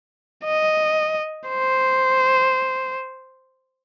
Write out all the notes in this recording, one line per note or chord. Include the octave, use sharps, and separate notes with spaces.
D#5
C5